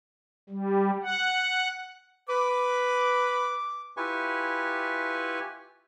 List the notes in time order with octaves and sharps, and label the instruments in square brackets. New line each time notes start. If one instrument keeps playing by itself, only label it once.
[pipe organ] G3
F#5
[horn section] B4 [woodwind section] D6
[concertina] E4 F4 G4 B4 G#5 C#6